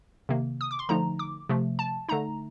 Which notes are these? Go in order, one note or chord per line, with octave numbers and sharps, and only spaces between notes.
C3 D#3 A#3
D#6
D6
C6
D3 F3 A3 D#4 A#5
D6
C3 F3 A3
A5
D3 A3 D#4 A#5